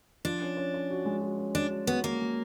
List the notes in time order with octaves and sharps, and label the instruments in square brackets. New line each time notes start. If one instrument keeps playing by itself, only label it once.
[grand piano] F3 [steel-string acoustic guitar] D4
[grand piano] C#4
C#4
C#4
F#4
G#3
F#4
C#4
[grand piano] C#4 [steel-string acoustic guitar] D4
[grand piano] F#4
[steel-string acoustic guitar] B3 [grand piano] F#4
[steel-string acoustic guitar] A#3 [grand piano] C#4
[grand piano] G#3